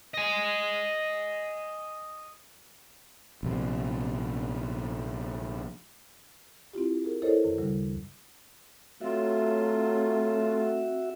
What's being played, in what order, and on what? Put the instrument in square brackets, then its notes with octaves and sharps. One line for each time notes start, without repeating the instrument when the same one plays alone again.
[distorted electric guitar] D#5 G#5
[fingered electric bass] A#1 C3
[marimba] C4 E4 F4 G4
G#4 A#4
E4 A4 A#4 C5 C#5 D#5
F#2 D#3
D2 C#3 G3
[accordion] F#3 F4 [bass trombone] A3 [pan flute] C4 [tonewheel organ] F#4 E5